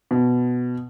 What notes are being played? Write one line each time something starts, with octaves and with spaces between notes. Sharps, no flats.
B2